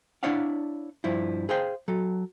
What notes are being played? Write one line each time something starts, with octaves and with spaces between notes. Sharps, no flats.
D4 E4 C#5 D5 F5 F#5
G2 F3 E4
G#4 C5 F5 G5
F#3 A4